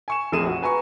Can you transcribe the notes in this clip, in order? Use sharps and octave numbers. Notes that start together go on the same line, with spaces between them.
G#5 C#6 E7
F1 A#1 C3 G#4 D#7 E7
F#4
B4 G#5 A#5 C#6